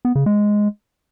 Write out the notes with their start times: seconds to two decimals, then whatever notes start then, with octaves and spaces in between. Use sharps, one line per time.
0.05 B3
0.15 C#3
0.26 G#3